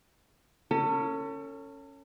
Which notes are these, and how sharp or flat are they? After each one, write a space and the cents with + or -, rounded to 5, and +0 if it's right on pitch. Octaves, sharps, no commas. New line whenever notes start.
C#4 +0 A4 +40